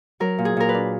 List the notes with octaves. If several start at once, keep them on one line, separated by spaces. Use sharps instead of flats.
F#3 A#4
A#2
G#4
A#2 A#4
B4
D4